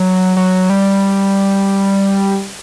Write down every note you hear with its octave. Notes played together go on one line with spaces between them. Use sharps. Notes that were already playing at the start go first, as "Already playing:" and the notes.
Already playing: F#3
F#3
G3